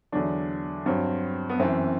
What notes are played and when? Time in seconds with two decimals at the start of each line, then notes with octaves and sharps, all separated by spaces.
0.12 E2 D3 F#3 D4
0.86 G2 F#3 C4
1.49 B3
1.60 F#2 E3 C4